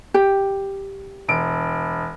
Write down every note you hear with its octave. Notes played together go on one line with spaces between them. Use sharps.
G4 G5
E1 D7